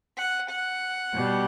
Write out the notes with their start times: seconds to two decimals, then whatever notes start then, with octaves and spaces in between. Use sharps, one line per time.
0.17 F#5
0.49 F#5
1.14 B2 G3